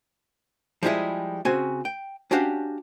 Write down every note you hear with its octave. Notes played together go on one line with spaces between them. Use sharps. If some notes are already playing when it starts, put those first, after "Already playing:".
F3 G3 G#3 E4 G#4
C#3 C4 F#4 G#5
G5
C#4 D4 F#4 G4 F5 F#5